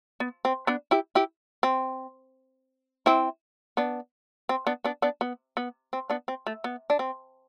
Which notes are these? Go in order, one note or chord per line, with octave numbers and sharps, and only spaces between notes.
B3
C4
B3 D4
E4 G4
E4 G4
C4
C4 E4
B3 D4
C4
B3 D4
B3 D4
B3 D4
B3
B3
C4
B3 D4
C4
A3
B3
D4
C4